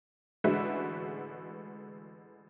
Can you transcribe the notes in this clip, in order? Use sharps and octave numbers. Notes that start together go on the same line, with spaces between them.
A1 D3 G#3 F#4 B4 E5